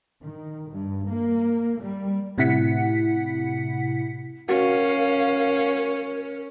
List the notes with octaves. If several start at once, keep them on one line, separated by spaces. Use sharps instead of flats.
D#3
G2
A#3
G3
A2 C3 E4 F#5 B6 C#7
C#4 F#4 A#4 F5